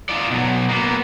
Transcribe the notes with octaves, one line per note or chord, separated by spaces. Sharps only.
D#4 F4 D5
B2 F#3
A#3 B3